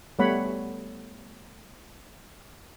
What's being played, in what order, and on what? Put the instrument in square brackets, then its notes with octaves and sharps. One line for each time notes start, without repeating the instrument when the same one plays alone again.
[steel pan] G3 A3 B3 C#5 F#5 B5